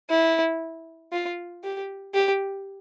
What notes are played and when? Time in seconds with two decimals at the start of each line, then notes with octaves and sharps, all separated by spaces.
0.10 E4
1.12 F4
1.64 G4
2.14 G4